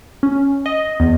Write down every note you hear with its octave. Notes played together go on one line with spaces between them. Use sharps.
C#4
D#5
E2